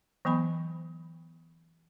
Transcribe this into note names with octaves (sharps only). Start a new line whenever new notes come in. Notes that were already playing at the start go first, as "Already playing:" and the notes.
E3 F#3 B3 G#5 B5